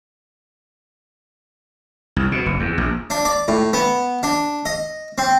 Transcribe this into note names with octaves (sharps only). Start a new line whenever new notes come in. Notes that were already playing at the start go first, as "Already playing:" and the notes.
C2
B2
F#1
E2
A#1
D4
D5
A2
B3
D4
D#5
C4